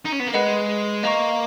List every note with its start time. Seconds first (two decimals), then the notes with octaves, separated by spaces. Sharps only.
0.05 D#4
0.12 C#4
0.20 B3
0.27 A#3
0.34 G#3 B4 D#5 F#5 B5
1.03 A#3 D#5 A#5 C#6